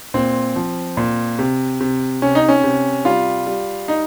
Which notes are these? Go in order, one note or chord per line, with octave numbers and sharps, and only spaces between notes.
A#2 C4
F3
A#2
C3
C3
C3 C#4
D#4
C#4
C3
G3 F4
G3
D#4